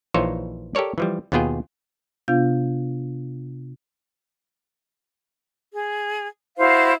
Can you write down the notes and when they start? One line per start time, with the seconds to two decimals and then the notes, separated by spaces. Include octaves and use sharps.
0.14 A#1 E3 D#4 F4 C5 C#5
0.75 G4 A4 A#4 C#5 D5
0.98 E3 F3 G3
1.32 D#2 B2 B3 F4 G#4 G5
2.28 C3 B3 D4 F4 F5 G6
5.73 G#4
6.58 E4 F#4 C5 F5